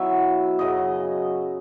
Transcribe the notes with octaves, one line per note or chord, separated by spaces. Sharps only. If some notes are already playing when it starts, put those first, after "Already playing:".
Already playing: B2 F#3 C#4 E4 E5
F#2 C#3 F#3 D#5